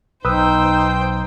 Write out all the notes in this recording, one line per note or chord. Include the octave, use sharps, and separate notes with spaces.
B1 D#4 B4 C5 G5 D#6 E6